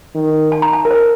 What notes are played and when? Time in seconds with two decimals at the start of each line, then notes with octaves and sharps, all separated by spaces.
0.15 D#3
0.52 A5
0.62 A#5
0.73 A5
0.85 A#4
0.91 C5